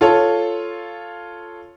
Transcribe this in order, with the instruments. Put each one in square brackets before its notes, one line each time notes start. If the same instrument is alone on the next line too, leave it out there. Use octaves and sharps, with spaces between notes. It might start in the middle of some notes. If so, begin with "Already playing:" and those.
[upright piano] F4 A4 C#5